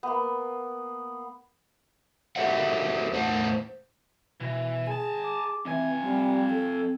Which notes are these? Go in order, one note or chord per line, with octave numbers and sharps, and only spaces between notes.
A#3 B3
F#4 G4 A4 C5 E5 F#5
E2 A2 C5 F#5 A5
B2 E3 E4
G#4 G#5 A5
D6
F2 E3 C4 G#5
G3 C4
A4